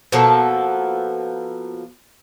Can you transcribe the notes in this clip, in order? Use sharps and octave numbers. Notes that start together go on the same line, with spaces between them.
B2 F3 A#3 A4